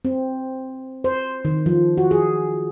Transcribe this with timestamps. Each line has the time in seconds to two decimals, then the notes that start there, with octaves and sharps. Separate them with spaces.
0.05 C4
1.04 C5
1.45 D#3
1.66 F3
1.97 F#4
2.11 G#4